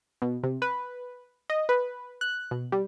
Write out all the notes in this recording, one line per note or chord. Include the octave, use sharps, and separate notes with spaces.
B2
C3
B4
D#5
B4
F#6
B2
G3